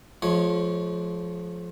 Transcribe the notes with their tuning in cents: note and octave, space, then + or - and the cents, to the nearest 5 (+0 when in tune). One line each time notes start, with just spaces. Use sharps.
F3 +0 G#3 +45 C#5 +0